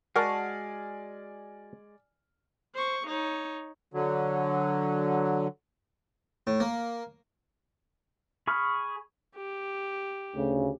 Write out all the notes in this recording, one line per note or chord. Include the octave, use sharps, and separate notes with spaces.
G#3 F#4 A#4 D5 F#5 G#5 A5 F6
C5 C#6
D#4 C#5
D3 F#3
A2
A#3
G#4 B5 C#6 F6
G4
D2 C#3